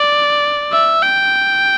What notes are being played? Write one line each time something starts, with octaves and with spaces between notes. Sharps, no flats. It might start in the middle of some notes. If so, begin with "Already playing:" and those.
Already playing: D5
E5
G5